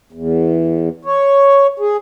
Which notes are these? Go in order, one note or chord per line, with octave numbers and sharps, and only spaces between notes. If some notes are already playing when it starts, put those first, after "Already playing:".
E2
C#5
G#4